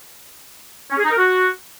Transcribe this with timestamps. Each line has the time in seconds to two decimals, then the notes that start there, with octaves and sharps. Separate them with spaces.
0.91 C#4
0.98 G#4
1.04 D#4
1.11 A#4
1.18 F#4